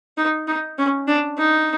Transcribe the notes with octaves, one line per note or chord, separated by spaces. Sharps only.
D#4
D#4
C#4
D4
D#4